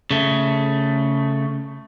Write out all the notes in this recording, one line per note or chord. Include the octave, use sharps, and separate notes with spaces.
C#3 A3